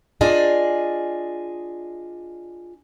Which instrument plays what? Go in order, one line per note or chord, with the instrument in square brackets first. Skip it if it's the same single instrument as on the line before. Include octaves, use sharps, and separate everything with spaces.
[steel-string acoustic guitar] D4 F4 G#4 D5 D#5